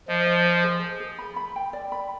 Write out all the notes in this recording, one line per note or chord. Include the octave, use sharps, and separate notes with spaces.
F3 D#5
D#5
D#5
G#4
G#4
G#4
B5
B5
G5
D5
B5